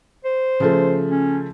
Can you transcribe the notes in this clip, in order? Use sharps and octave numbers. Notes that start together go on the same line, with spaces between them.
C5
C#3 F3 A3
C#4